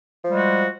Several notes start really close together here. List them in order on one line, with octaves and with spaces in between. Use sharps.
F3 G#3 G3 F#4